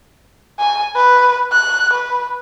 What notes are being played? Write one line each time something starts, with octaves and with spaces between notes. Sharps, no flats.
G#5
B4
F#6
B4